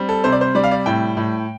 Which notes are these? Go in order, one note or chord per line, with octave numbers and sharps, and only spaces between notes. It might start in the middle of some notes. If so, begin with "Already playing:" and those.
Already playing: G3 C4
A4
C3 C5
D5
C5
G3 D5
F5
D5
A2 G5
A2